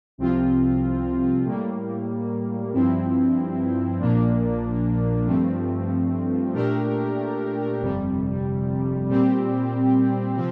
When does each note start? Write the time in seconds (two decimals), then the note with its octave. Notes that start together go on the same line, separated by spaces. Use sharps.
0.18 C2 C3 F3 C4 F4
1.44 A2 G3 A#3
2.72 G2 F3 C4 E4
3.99 A#1 A#2 F3 A#3 D4
5.26 G2 F3 A3 C4
6.53 A#2 A3 D4 G4 A#4
7.81 G1 F2 C3 G3
9.08 A#2 G3 C4 G4
10.35 C3 F3 C4